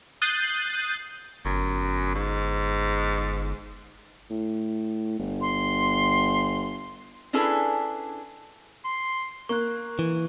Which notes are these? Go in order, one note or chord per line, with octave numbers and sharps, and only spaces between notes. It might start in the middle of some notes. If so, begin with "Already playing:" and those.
D#6 F#6 G6 A6 C7 D#7
G1 F#2
G#2
A2
G1
C6
C#4 D4 E4 G#4 A4 B4
C6
A#3 C#6 F#6
E3